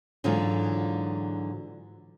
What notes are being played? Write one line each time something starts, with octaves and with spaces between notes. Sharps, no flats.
G#2 D3 E3 F#3 D#4 F4